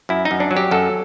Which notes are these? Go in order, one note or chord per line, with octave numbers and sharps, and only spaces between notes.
F#2 E4
D#4
F#2
D4
F#3
G4
F#2 A4